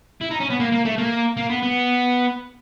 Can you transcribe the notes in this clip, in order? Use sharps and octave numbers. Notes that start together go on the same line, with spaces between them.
E4
D#4
C#4
B3
A#3
A#3
A3
A#3
A#3
B3
B3